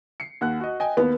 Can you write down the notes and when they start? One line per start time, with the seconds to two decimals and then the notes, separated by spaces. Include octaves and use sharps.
0.20 C7 C#7
0.41 D#2 F#5 F#6
0.60 F#4 D#5
0.80 D#5 G5 G#5
0.97 D#2 B3